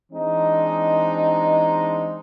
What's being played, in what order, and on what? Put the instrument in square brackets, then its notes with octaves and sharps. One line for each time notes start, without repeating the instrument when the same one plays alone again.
[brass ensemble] E3 G#3 C4 D4 D#4